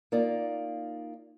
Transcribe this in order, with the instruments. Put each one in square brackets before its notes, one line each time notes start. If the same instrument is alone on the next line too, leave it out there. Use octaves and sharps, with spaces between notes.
[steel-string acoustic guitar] A#3 D#4 F4 D5